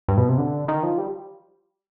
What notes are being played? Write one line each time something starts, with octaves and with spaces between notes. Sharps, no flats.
G2
B2
C3
D3
D#3
F3
G3